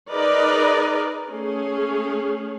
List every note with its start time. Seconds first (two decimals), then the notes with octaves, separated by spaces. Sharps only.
0.12 D#4 G#4 A#4 B4 D5 D#5
1.28 A3 C#4 G#4